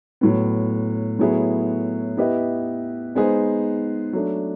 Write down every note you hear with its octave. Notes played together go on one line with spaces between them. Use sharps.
A2 F#3 B3
A2 F#3 B3 E4 G#4
B3 E4 G4 B4 D#5
G#3 B3 D#4 G#4 C5
F#3 A3 D4